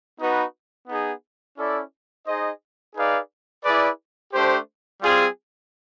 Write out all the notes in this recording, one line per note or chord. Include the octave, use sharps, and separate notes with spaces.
B3 D#4 F#4 B4
B3 D#4 G#4
C#4 E4 A4 D5
D#4 G#4 C5 D#5
D#4 G#4 B4 D5 F5
E4 G#4 B4 D5
A3 D4 G4 C5
G3 C4 F4 G#4